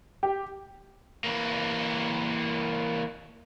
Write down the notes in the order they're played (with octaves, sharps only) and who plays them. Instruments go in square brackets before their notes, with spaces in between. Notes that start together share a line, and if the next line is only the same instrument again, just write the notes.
[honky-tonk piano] G4
[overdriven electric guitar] E3 A#3